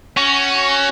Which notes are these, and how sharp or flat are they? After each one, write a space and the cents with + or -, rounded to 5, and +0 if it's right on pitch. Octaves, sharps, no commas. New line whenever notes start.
C#4 +0 F#4 +20